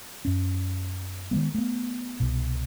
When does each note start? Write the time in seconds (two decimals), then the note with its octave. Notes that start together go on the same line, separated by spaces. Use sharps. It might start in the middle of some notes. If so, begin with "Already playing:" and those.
0.25 F#2 C#4
1.31 D#3 F#3 G#3 B3
1.54 A3 B3
2.20 C2 B2